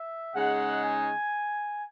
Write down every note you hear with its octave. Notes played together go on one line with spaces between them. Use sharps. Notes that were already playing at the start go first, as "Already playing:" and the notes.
Already playing: E5
C#3 G#3 D#4 F#5
G#5